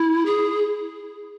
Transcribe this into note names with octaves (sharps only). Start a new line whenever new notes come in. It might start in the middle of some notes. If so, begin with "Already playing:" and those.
Already playing: E4
G#4